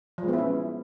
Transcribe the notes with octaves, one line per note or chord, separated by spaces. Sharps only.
F3
G#3
B3
E4
C#4